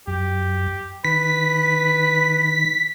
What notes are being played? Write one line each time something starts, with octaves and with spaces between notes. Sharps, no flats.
F#2 G4
D#3 B4 B6